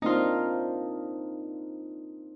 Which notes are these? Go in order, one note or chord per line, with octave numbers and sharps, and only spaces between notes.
A#3 C4 D4 D#4 F4